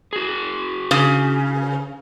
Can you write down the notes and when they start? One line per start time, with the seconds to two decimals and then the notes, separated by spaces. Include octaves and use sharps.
0.13 F#4 G#4
0.91 C#3